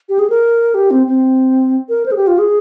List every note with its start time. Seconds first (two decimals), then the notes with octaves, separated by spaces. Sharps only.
0.09 G4
0.19 G#4
0.30 A#4
0.74 G4
0.91 C4
1.07 C4
1.89 A#4
2.06 C5
2.12 G#4
2.16 G4
2.27 F4
2.38 G#4